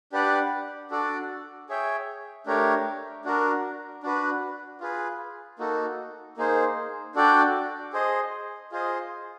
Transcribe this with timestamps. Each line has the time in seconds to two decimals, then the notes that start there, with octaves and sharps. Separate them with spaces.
0.12 D4 G4 B4 D5 F#5
0.90 D4 F#4 A4 D5
1.69 G#4 C#5 E5 G5
2.46 A3 D4 G4 A#4 C#5
3.25 D4 F#4 A#4
4.03 D4 F#4 B4
4.80 F4 G#4 B4
5.59 A#3 D#4 F#4 A4
6.37 A#3 D#4 G#4 C5
7.15 D4 F#4 A4 D5 G5
7.93 G#4 C5 D#5
8.72 F4 G#4 C5 D#5